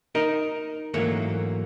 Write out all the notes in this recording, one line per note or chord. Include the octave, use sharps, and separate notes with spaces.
D#4 A#4 D#5
G#2 E3 F#3 A3 A#3